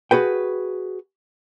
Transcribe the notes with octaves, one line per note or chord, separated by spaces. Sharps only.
F#4 G#4 B4 G5